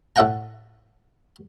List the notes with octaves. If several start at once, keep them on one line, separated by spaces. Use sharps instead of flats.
A2 A4 E5 F#5 G5 A#5